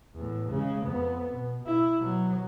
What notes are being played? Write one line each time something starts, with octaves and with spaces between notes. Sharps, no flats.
E2 A2
C#3 G#3
F2 B3
B2
E4
B2 F#3